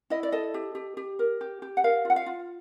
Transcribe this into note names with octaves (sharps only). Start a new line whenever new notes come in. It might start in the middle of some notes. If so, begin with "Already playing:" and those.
E4 D#5
D5
A4 D#5
G4
G4
G4
A#4
G4
G4
F#5
A#4 F5
F4 F#5
F5
F4